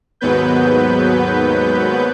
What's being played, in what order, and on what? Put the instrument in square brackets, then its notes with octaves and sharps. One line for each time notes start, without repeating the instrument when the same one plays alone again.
[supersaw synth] D#2 G#2 F#3 B3 B4 G6